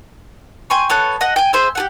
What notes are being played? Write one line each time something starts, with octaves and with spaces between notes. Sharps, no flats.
G5 G#5 C6 C#6
B3 A4 C#5 F#6
D#5 F#5
G5 G#5
G#4 C5 E5
G4 G#4 F#5